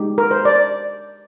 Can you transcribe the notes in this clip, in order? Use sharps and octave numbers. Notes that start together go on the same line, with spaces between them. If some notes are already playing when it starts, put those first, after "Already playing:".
Already playing: G#3 D#4 G4
A#4
C5
D5